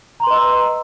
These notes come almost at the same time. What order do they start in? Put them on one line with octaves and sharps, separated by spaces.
A#5 C6 B4 D#5 E6